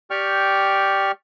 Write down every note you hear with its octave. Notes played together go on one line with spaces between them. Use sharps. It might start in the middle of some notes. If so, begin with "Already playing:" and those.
G4 D5 G5 C#6 F6